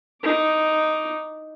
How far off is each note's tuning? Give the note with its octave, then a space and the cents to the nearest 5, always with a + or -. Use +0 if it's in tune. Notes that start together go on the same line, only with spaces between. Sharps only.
D#4 +0 D6 +0